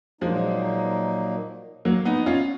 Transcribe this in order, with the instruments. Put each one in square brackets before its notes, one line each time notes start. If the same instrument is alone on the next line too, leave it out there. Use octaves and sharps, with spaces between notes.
[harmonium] A#2 F#3 A#3 D#4 [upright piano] F3 G#3
[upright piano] F#3 A#3
B3 D#4
C#4 F4